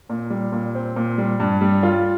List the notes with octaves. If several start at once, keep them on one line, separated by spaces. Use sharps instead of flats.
A#2
G3
A#2
C4
A#2
G3
G2
G3
F4